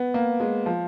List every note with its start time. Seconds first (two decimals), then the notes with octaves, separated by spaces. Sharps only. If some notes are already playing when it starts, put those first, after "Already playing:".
Already playing: B3
0.14 A#3
0.40 G#3
0.66 F3